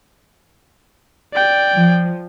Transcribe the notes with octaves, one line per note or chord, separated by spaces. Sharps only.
D5 G5
F3